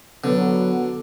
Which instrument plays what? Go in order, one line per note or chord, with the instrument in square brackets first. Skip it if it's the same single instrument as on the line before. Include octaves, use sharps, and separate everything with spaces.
[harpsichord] D3 [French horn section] F#3 B3